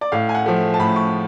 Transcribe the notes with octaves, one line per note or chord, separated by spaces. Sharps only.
D5
A2 F5
G#5
F#5
F3 A3
A5
A2 B5
C#6